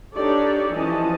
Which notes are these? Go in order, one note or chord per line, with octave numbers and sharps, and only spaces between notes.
D4 D#4 G4 A4 C#5 D5
E3 F3 C#4 D#5 A5